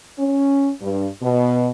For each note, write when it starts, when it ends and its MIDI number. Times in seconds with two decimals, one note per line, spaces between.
0.18 0.68 61
0.81 1.06 43
1.22 1.70 47